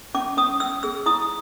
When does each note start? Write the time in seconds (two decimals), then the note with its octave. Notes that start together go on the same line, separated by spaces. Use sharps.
0.14 C#4 D6
0.37 C#4 D#6
0.60 C#4 E6
0.83 G#4 E6
1.06 E4 D#6